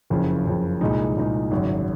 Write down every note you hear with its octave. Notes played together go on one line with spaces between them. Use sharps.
F#1 F2 C#3
F#1 F2 C#3
C2 A#2 G#3 D#4
C2 A#2 G#3 D#4
G#1 F#2 C#3 F#3